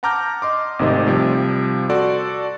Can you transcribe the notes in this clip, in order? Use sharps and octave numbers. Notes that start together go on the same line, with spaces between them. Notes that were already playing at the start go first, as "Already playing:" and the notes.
F#5 A5 A#5 D6 F6 G6
D#5 C6 D6
G#1 C3 D#3 A3 D#5
C3 F3 G3
F#4 A4 D5 F#5 C6